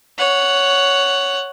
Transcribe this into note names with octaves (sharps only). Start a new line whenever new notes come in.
C#5 F#5